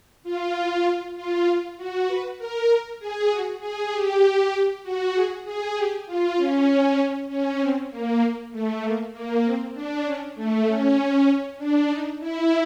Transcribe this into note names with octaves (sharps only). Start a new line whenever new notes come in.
F4
F4
F#4
B4
A#4
G#4
F#4
G#4
G4
F#4
G#4
G#4
G4
F4
C#4
C#4
C4
A#3
A3
A#3
A#3
C4
D4
C#4
A3
C#4
D4
D#4
E4